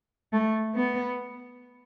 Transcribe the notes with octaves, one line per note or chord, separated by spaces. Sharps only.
A3
B3